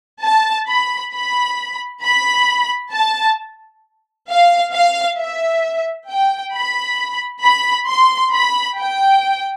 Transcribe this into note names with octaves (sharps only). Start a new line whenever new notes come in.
A5
B5
B5
B5
A5
F5
F5
E5
G5
B5
B5
C6
B5
G5